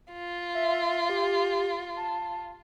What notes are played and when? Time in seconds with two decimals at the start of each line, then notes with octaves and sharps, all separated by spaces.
0.12 F4
0.54 E5
1.10 G4
1.97 A5